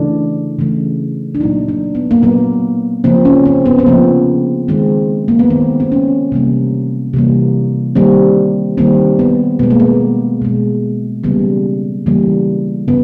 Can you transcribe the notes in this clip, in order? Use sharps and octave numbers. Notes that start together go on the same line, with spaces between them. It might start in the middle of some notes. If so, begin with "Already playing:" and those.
Already playing: C#3 E3 A3 D4
C#3 E3 A3
D4
A#2 F#3 A#3 D#4
D4
B3
A#3
A#2 F#3 A#3 B3
C#3 F3 A#3 C4
C#4
C4
B3
C4
C#3 F3 A#3 B3
D#3 G#3 C4
A#3
B3
D#3 G#3 C4
C4
C#4
C3 E3 G3 A#3
C3 E3 G3 A#3
D#3 G3 A#3 C4
D#3 G3 A#3 C4
B3
B2 G#3 B3
A#3
B3
B2 G#3
C#3 E3 G3 A#3 B3
C#3 E3 G3 A#3
C#3 B3